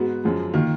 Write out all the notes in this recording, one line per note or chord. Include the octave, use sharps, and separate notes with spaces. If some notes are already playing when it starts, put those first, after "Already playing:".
Already playing: G#2 B3 F#4
F#2 F3 G#3
D#3 A#3 F4